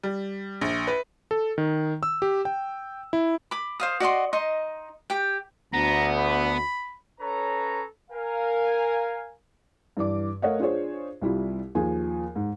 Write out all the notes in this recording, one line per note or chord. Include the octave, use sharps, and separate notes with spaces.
G3
A#1
B4
A4
D#3
E6
G4
G5
E4
B5 D6
C5 F5 D#6
F#4 D5 D#5 C6
D#4 D#5 C6
G4 G5
D2 B3 A#5
B5
C#4 A4 B4 C#5 A#5
A#4 F5 G#5
G2 E3 D5 D6
A3 A#4 C#5 D#5 F5 F#5
D4 F4 G#4 C5 C#5
C2 G3 E4 F4
D#2 F3 G#4 G#5
G#2